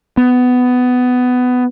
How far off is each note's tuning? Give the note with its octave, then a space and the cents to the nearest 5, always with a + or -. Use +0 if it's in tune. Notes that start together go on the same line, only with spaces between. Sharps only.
B3 +15